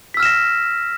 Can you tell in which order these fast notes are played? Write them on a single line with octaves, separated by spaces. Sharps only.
B6 E6 F6 E7 A#6